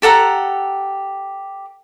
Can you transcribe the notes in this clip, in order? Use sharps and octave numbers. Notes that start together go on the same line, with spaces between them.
G4 A4 F#5 A#5